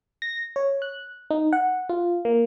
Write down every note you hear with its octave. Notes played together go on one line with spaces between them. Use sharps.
A#6
C#5
F#6
D#4
F#5
F4
A#3